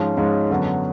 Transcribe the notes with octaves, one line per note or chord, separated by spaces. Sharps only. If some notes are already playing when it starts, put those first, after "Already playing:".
Already playing: G#2 F3 G#3 C#4
G#2 F3 G#3 C#4
F#2 D3 F#3 B3